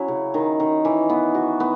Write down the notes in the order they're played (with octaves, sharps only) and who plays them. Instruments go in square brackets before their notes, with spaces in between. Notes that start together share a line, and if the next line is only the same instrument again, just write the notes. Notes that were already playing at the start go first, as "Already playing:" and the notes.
Already playing: [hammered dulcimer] F#3 C#4 E4
C#3
D#3
D#3
E3
B3
F#4
B3